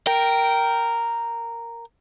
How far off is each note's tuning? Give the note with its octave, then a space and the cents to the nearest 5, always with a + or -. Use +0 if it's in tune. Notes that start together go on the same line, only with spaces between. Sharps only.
A#4 -5 G5 -10